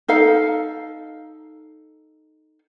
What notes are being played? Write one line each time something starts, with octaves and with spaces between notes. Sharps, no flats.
D#4 A4 F5